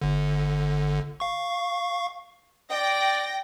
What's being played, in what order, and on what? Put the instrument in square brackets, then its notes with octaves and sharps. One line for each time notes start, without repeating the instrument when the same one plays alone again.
[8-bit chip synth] G1 D3
F5 C#6
[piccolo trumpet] D5 [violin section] G5 A#6